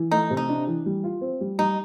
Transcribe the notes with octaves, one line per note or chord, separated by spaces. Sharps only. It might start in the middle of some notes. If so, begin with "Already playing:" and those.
Already playing: E3
A3 D#4
C3
D#4
D4
E3
G3
F4
C4
G3
G3 D#4